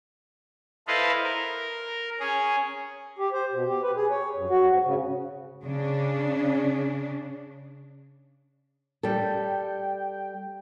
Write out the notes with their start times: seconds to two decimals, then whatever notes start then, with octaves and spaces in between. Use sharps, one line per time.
0.88 E4 A4 B4 C5 D#5 F5
1.23 A#4
2.20 C#4 G#4
3.18 G4
3.32 C5
3.53 B2
3.67 G4
3.83 B4
3.96 G#4
4.10 C#5
4.36 F#2
4.50 F#4
4.68 G#2
4.85 C#3
5.64 C#3 D4
9.03 G3 A4 G5